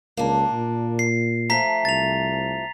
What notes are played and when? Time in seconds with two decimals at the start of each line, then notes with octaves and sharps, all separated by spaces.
0.17 C#2 A#3 D4
0.52 A#2
0.99 C7
1.50 F3 A3 A#5 B6
1.85 C2 A6 F7